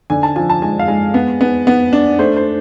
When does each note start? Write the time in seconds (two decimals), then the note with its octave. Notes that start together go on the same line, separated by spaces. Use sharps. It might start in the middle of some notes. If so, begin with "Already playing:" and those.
0.10 D3 G#5
0.23 A5
0.36 F3 G#5
0.50 A5
0.62 G#3 G#5
0.79 F5
0.88 G#3
1.14 B3
1.41 B3
1.67 B3
1.93 D4
2.19 A3 C5
2.37 C5